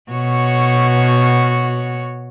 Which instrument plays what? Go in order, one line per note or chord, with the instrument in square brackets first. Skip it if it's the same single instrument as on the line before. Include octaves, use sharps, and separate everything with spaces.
[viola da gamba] B2 F#4 C#5